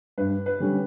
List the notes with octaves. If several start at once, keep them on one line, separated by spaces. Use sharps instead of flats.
G2 B4
B4
D3 G3 C#4